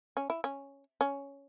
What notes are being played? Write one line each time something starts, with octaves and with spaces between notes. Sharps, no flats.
C#4
E4
C#4
C#4